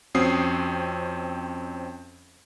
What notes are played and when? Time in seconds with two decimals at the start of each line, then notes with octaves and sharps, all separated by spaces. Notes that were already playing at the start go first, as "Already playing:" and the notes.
0.15 F2 C4 C#4 F#4 D#6 C7